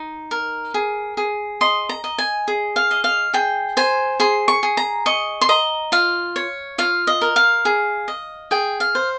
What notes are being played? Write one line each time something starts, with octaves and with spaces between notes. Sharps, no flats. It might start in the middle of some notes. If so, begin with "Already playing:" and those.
Already playing: D#4
A#4
G#4
G#4
D#5 C6
A#5
D#5
G#5
G#4
F5
D#5
F5
G#4 G5
C5 G#5
G#4 C6
C#6
G#4
A#5
D#5 C#6
C6
D#5 A#5
F4 F5
C#5
F4 F5
D#5
A#4
F5
G#4
D#5
G#4 G5
F5
C5